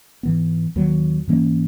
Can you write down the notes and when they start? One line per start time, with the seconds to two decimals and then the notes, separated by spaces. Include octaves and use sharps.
0.23 G#2 E3 B3
0.76 D#2 D#3 F#3
1.27 G#2 E3 A#3 C#4